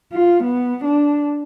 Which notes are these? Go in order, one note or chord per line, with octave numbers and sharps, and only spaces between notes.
F4
B3
D4